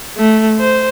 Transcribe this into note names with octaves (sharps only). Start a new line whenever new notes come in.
A3
C5